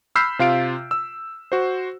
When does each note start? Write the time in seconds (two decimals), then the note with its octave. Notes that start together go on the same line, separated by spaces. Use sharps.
0.15 B5 E6 F6 G6 B6 C7
0.39 C3 F4 F5 D7
0.91 E6
1.52 F#4 C5